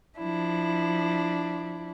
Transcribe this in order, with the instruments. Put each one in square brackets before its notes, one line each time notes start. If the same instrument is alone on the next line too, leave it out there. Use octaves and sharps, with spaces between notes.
[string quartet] F3 D4 E4